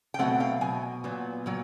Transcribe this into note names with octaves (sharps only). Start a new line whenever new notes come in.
G5
B2 F#3 A3 C4 F#5
F5 G5
B2 F#3 G#5
A#2 F#3 B3
A#2 F#3